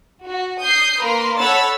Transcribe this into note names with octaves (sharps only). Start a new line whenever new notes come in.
F#4
D#6 G6 C7
A#3 A#4 B4 A#5 C6
A4 C#5 F#5 B5 E6 A6